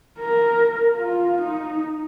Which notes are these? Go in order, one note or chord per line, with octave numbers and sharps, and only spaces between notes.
A#4
F4
D#4